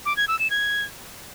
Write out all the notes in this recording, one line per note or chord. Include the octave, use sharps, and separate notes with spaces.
D6
G#6
E6
E7
G#6